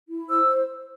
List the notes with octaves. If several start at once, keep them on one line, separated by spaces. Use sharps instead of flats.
E4
C5 E6